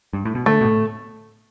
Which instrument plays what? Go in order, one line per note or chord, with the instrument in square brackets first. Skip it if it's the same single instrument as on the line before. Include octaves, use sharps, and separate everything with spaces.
[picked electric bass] G2
A2
B2
[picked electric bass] D3 [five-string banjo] A3
[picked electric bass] B2
A2